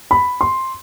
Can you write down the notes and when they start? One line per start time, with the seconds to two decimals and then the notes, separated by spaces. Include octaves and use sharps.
0.11 B5
0.41 C6